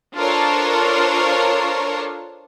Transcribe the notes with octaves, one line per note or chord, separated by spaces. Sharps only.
D4 F4 A4 A#4 C5 C#5